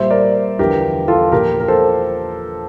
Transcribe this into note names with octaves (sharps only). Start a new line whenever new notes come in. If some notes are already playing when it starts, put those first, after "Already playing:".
Already playing: A#2 G3 C5 E5
A#4 D5
E2 D3 F3 G4 A#4
F4 A4
A#2 F3 G4 A#4
A#4
A4 C5